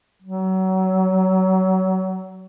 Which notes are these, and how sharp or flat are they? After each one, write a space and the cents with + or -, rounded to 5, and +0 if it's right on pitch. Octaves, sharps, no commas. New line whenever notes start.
F#3 +25